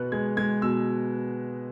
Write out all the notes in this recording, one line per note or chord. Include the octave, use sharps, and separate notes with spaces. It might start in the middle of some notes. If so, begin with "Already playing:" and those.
Already playing: B2 B3 F#6
G#3 G#6
G#3 G#6
B2 E6